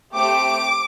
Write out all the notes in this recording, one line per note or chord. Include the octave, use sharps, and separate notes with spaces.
A3 C4 G4 D6